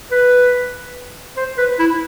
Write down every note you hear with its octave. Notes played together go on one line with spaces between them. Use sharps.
B4
C5
B4
E4